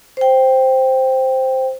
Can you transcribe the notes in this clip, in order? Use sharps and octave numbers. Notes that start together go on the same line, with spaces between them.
C5 G5